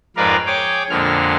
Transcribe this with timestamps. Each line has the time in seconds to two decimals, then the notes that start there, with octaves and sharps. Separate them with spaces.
0.17 F2 G#2 A#4 B4 D5 F5
0.46 G#4 C#5 G5 D6
0.90 F2 A#2 D3 G#3 F6